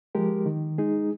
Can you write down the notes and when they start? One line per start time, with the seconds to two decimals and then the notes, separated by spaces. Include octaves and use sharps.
0.15 F3 G#3 G4 A#4
0.46 D#3
0.78 G#3 D#4 G#4